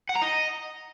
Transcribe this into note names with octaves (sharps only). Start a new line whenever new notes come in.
F#5
A#5
D#5